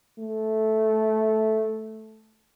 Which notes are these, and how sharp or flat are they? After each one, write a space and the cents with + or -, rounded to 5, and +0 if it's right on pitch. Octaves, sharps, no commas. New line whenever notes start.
A3 -10